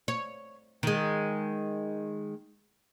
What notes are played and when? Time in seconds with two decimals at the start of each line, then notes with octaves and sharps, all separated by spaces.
0.08 C#5
0.83 D#3 G#3